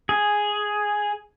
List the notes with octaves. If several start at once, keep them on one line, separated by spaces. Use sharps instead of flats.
G#4